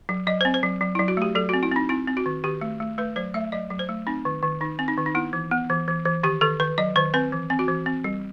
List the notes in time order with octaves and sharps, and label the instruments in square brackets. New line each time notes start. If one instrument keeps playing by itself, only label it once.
[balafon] F#3
F#3 D#5
C4 C5
C5
F#3
F#3
F#3 E4
F#4
A3 G4
F#3 A4
F#4
C4
E4
C4 D#4
C4 E4
C4
F#4
D#3
D#3 G4
A3
A3
A3 B4
F#3 C5
A3 E5
F#3 D#5
F#3
C5
A3
C4 D#4
D#3
D#3
D#3 D#4
C4
D#4
D#3
D#4
B3 E4
E3
B3
E3
E3
E3
D#3 G4
D#3 A4
D#3 B4
F#3 D#5
D#3 C5
C4 B4
E3
C4
F#4
E3
C4
G3